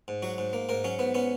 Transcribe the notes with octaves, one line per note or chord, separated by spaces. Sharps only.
G#2
F#3 F#4
G#2
A#3
G#2 A#4
F#3 C#4
G#2 B3
B3 C#4